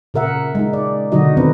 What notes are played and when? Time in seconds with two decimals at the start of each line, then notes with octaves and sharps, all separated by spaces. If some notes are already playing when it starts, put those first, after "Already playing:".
0.14 A#2 C#3 A#4 E5 F#5
0.55 G#3 D#4
0.73 D5
1.12 B2 D3 F#3 D#4 F#4 D#5
1.37 D#3 B3 C4 D4 D#4 B4